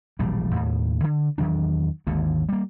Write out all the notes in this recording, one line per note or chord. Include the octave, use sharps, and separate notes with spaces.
E1 A#1 A2 G3
D#2 A2
D3
E2 D#3 F#3 D4
G#1 D#2 G#2 D3
G3 A#3